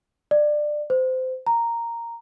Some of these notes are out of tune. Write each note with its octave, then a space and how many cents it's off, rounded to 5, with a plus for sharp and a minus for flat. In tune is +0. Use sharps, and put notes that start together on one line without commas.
D5 +20
C5 -25
A#5 -5